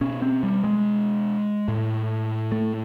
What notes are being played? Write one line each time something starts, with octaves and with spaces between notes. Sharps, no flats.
B2 C#4
C4
G3
G#3
A2
A3